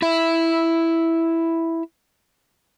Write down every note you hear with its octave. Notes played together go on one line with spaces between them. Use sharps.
E4 E5